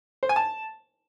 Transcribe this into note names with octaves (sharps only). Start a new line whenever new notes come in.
C5
G#5
A5